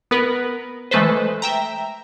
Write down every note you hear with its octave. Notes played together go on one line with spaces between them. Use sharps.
B3 A#4 B4
E3 G#3 A3 A4 B4 C5
E5 G5 A#5